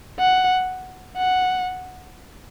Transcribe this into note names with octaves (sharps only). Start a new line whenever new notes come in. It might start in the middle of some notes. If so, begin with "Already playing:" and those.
F#5
F#5